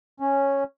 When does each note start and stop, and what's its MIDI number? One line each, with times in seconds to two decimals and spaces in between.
0.20 0.64 61